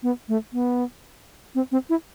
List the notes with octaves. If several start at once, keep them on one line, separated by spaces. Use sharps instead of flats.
B3
A3
B3
C4
C4
E4